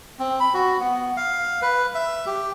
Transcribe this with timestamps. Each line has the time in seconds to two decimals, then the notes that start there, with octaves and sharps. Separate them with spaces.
0.19 C4
0.40 B5
0.54 F#4
0.80 B3
1.17 F5
1.62 B4
1.94 E5
2.26 G4